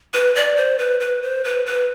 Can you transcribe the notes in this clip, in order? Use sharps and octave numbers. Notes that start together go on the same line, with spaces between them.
B4
D5
C5
B4
B4
C5
B4
B4